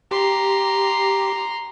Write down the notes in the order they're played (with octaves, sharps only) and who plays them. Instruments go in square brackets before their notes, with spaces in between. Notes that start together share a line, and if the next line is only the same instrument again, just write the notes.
[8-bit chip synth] G4 [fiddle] A#5 C6